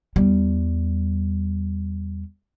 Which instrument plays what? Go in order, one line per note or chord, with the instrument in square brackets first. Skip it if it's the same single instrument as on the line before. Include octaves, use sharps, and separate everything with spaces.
[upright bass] E2 G3